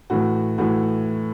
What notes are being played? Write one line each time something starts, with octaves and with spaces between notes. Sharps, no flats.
A2 E3 F#4
A2 E3 F#4